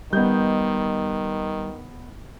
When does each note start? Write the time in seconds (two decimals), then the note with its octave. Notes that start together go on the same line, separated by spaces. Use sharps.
0.13 D#3 G3 B3 D#5 G6